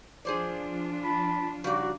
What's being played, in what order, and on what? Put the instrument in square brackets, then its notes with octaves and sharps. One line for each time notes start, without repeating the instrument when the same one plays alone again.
[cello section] F3 D4 F4 [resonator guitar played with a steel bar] G#4 C5 D5
[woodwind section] A5 B5
[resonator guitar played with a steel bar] C#3 G3 D5 [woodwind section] D#4 F#4